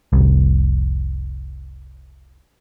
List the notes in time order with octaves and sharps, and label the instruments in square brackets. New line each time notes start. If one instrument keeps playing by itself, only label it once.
[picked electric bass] F1 C2